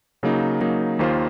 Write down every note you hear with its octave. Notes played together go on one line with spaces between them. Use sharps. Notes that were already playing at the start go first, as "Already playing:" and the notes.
C#3 F#3 A#3 D#4
C#3 F#3 A#3 D#4
D#2 D#3 A#3 F4 C5